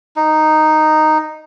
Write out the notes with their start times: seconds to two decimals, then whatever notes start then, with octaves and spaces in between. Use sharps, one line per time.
0.16 D#4